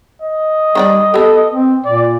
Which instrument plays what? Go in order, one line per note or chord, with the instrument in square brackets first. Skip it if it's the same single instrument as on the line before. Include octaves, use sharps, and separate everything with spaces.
[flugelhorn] D#5
[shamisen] D#3 D#4 D5 [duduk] G3
[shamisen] B3 G4 [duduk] A4
[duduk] C4
[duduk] A#2 [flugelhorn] D5